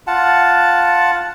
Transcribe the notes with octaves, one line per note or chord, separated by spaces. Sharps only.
F4 F#5 A5